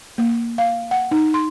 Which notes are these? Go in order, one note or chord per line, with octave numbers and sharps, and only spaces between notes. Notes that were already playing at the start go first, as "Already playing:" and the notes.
A#3
F5
F#5
D#4
C6